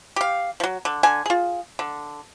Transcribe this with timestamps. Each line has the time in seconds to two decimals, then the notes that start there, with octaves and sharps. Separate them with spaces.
0.16 G4 F5
0.60 F3 F#3
0.85 D3
1.03 D3 G#5
1.26 F4 G#4
1.79 D3